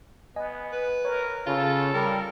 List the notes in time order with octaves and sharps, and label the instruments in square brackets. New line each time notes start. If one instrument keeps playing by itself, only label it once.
[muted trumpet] B3 [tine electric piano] D#5 G#5
[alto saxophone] B4
[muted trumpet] A#4 [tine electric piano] C#5
[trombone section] C#3 [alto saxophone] F4 [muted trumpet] A4
[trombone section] G3 [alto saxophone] A#4